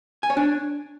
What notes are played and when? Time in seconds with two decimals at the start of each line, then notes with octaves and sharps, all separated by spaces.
0.23 G#5
0.30 C#5
0.37 D4